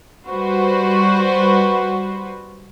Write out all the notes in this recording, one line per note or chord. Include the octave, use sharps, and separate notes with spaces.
G3 F#4 B4 C5